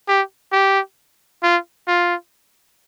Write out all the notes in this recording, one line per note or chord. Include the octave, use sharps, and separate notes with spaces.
G4
G4
F4
F4